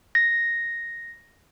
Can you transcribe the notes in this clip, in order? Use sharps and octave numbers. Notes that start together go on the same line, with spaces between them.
A#6